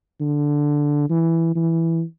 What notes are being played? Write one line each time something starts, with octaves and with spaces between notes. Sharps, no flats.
D3
E3
E3